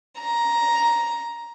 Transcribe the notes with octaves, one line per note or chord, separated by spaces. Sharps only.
A#5